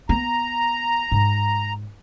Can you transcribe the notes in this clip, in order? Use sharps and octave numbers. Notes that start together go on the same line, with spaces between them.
B3 A#5
G#2